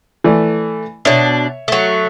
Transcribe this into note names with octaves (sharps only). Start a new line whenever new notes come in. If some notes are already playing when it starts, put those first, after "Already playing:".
E3 A3 D5
B2 D4 C#5 E5
F#3 A3